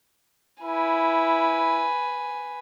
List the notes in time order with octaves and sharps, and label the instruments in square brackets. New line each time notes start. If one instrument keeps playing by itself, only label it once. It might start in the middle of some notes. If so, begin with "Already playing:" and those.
[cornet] E4 [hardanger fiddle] B4 G#5